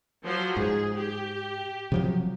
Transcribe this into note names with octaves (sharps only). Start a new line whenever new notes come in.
F3 F#3 C5
G#2 G#4
G4
C3 F3 F#3